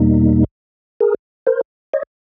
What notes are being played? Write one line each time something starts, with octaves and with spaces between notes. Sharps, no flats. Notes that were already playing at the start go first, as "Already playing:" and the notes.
Already playing: E2 B2 G3 A#3 D#4
G#4 A#4
A#4 C5
C#5 D#5